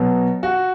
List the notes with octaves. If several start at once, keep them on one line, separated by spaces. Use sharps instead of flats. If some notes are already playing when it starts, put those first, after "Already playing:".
Already playing: B2 F#3 B3
F#4